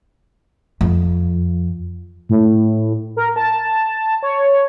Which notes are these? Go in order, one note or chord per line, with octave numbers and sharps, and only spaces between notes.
F2
A2
A#4
A5
C#5